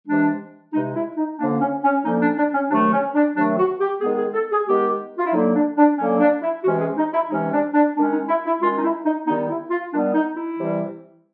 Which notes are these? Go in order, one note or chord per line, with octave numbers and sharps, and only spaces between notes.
C3 E3 G#3 D4
C3 E3 G#3 D#4
E4
D#4
D3 F3 A#3 C#4 D4
C#4
C#4
D3 F3 A#3 C#4 D#4
D4
D4
C#4
C3 D#3 F#3 A3 D4
C#4
D4
C3 D#3 F#3 A3 D4
F#4
G4
D#3 G#3 B3 G#4
G#4
A4
G#4
D#3 G#3 B3 G4
F4
E4
D3 F#3 A#3 D#4
D4
D4
D3 F#3 A#3 C#4
D4
E4
C3 E3 G#3 C#4 F#4
G#4
D#4
E4
C3 E3 G#3 C#4 D#4
D4
D4
D#3 G#3 C#4 D4
D#4
E4
E4
D#3 G#3 C#4 F4
D#4
E4
D#4
D#3 G3 B3 D#4
E4
F4
D#3 G3 B3 D4
D#4
E4
C3 E3 G3